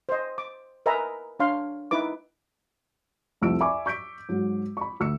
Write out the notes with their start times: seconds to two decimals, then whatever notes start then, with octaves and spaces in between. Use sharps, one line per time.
0.09 C5 D#5
0.38 D6
0.86 A#4 B4 D#5 E5 G#5 A#5
1.40 D4 C#5 F5 C6
1.91 D#4 E4 B4 D6
3.41 C2 F2 A3 E6 D7
3.60 D5 E5 G#5 B5 C#6 D6
3.86 C#6 G6 B6 D7
4.29 G#2 F#3
4.77 B5 C#6
5.00 D2 E6 C#7